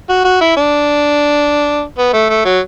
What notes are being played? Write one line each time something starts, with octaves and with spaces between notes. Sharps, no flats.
F#4
F#4
E4
D4
B3
A3
A3
F#3